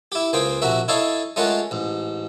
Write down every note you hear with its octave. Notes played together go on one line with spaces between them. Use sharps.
E4 G4
C#2 A#3 G#4 C5 G5
A#1 C3 F#4 A#4 E5
D#4 E4 A4 C#5 F5
G#3 A3 C#4 F4 A#4 F#5
A1 G#2